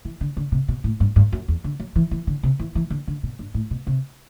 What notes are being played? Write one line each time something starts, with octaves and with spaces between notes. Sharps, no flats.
E3
D3
D3
C3
B2
A2
G2
G2
F#2
E2
D3
F#3
E3
E3
D3
C3
E3
E3
D3
D3
B2
G2
A2
B2
C3